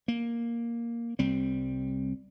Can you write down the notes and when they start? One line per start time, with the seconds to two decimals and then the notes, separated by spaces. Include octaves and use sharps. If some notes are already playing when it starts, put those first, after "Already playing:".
0.08 A#3
1.19 C2 G3 C4